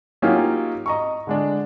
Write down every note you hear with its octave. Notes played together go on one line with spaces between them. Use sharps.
F#3 A#3 C#4 D#4 F4 G4
D#5 A#5 C#6
D3 G#3 D4